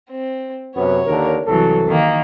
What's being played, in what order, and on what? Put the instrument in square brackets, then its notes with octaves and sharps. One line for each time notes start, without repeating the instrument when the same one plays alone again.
[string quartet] C4
[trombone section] F#2 C3 B3 [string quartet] C#5
[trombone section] D#2 D3 A#4
[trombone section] C2 A4 [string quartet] E3 F#3
[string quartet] D#3 A#3